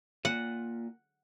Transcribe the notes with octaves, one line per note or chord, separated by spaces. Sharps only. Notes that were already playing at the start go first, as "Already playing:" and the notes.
A#2 F#5